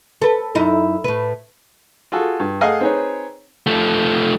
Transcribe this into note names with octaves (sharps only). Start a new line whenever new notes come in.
A4 B4
F#2 D#4 E4
A2 B4
F4 F#4 G#4 A4
G2
A3 G#4 D#5 F5 F#5 G#5
C4 D#4 G#4 B4 C#5
F3 A3